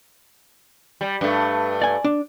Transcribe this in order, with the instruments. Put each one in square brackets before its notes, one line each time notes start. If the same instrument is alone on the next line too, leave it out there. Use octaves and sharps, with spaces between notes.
[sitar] G3
G2 A3
[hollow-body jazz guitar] D5 G#5
D4